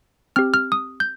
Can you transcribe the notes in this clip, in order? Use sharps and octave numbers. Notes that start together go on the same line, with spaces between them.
C4 G4 F6
F6
D#6
G6